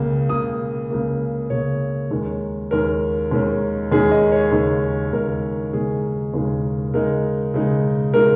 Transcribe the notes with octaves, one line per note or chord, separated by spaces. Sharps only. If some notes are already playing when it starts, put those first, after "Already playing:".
Already playing: C#2 C#3 A#3
C#2 C#3 A#3 D#6
C#2 C#3 A#3
C#2 C#3 A#3 C#5
D#2 D#3 G#3 C#4
D#2 D#3 G#3 C#4 A#4
D#2 D#3 G#3 C#4
D#2 D#3 G#3 C#4 G#4
D#5
C#5
D#2 C#3 G#3 D#4
D#2 C#3 G#3 D#4 A#4
D#2 C#3 G#3 D#4 G#4
D#2 C#3 G#3 D#4
C#3 G#3 D#4 A#4
C#3 G#3 D#4
C#3 G#3 D#4 A#4